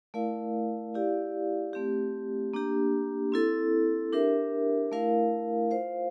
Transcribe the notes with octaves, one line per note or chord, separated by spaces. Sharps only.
A3 E4 A#4 D5 F5
E4 G4 D5 F5
A3 C4 G4
A#3 D4 G4
C4 E4 A4
D4 G4 A#4 E5
A3 E4 A#4 F5
F4 C5 F5